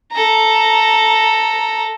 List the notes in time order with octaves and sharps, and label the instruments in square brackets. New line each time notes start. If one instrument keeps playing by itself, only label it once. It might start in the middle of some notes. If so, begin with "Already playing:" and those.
[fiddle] A4 A#5